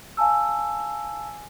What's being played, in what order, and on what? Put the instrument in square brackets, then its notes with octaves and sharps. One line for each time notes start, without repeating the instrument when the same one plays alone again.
[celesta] F5 G#5 A5 E6